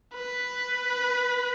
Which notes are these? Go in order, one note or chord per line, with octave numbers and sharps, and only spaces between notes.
B4